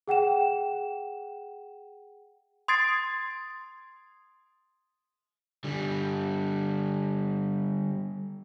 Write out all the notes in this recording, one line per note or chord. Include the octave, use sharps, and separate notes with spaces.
G#4 F#5 G5 E7
C6 D#6 G#6 A6 C7 D7
D3 G3